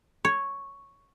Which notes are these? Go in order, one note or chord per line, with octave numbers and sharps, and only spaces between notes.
C#5